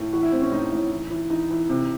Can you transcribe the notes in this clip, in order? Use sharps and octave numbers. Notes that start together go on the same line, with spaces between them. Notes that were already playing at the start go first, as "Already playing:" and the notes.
Already playing: A2
E3 F#4
E4
A2 C4
C#4
A2 D#4
A2
E3
E3
E3 D#4
E3
C3